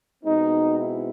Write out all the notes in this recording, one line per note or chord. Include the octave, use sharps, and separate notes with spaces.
B2 G#3 C4 D#4
E4